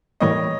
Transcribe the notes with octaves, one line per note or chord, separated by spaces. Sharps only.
A2 E3 G3 A#3 C#5 D#5